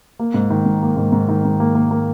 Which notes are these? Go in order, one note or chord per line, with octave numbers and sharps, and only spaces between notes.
A#3
G#2
D#3
G#2
A#3
G#2
G#2
D#3
G#2
A#3
A#3
A#3